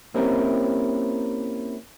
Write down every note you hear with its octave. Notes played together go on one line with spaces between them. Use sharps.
A#3 C4 C#4 E4 G4 A#4